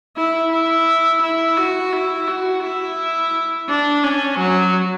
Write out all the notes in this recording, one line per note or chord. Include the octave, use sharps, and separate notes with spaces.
E4
E4
E4
F#4
E4
F#4
E4
D4
C#4
F#3